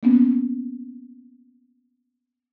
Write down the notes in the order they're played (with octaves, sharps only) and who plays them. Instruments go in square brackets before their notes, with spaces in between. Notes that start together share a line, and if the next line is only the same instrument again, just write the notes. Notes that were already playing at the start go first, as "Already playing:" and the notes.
[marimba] A#3 B3 C#4